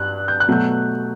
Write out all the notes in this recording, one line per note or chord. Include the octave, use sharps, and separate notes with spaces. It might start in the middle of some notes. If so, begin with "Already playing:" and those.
Already playing: G2 F#6
G6
F#6
B2 F#3 A3 G6